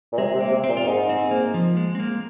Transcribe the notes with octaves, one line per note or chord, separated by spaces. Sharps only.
A#2
C3 G#3
C3
A#3
C3
C4
A#2
F4
G#2 D#4
C4
A#3
F3
G#3
C4
A#3